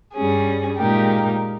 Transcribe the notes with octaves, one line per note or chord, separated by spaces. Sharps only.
G2 G3 C#4 G#4
A#2 G#3 D#4 G4 A#4